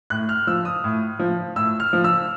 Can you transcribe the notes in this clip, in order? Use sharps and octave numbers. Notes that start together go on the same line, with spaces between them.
A2 F#6
F6
F3 E6
D#6
A2
F3
A2 E6
F6
F3
E6